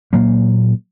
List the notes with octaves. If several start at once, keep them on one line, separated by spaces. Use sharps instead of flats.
A#2 F#3 A#3